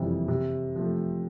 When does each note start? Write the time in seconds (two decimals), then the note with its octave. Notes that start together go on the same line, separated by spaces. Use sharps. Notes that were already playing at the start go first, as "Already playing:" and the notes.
Already playing: F#1 F2 C3 E3 G3
0.28 C3
0.76 F3 A3